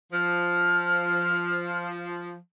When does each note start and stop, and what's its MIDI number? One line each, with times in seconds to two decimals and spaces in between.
0.13 2.36 53
0.13 1.85 89